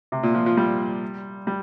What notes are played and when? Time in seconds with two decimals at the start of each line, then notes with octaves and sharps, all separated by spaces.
0.12 C3
0.23 A#2
0.34 F3
0.46 F3
0.57 G3
1.47 G3